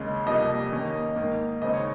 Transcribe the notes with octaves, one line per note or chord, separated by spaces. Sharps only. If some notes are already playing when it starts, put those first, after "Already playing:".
Already playing: D#2 C#3 G#3 C#4
F2 C3 G3 A#3 D#5
D#2 D#3 A#3 C#4
G#2 D#3 A#3
D#2 C#3 G#3 C4 D#4 D#5
C#5